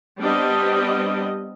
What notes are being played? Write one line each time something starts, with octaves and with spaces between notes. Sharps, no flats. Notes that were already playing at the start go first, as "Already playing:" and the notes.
G3 B3 C4 D4 G4 D#5